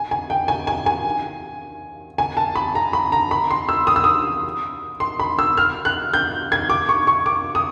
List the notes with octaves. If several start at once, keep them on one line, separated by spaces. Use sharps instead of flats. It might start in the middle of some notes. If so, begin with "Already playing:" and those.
Already playing: G#5
G#5
G5
G#5
G#5
G#5
G#5
A5
B5
A#5
B5
A#5
B5
C6
E6
D#6
E6
D#6
C6
B5
E6
F6
F#6
G6
G#6
D6
C#6
C#6
D6
D#6